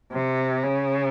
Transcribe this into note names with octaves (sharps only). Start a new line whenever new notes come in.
C3
C#3